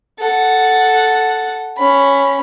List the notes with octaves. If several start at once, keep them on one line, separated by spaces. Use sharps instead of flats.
A4 F#5
C#4 B5